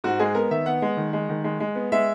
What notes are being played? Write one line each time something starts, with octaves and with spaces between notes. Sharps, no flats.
G#2 F#4
G#3 G#4
B3 A#4
D#3 E5
B3 F#5
G#3
D#3
G#3
D#3
G#3
G#3
B3
G#3 E5